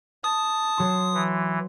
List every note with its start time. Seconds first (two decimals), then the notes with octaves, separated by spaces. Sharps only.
0.24 A5 D#6
0.78 F#3 C6
1.14 E3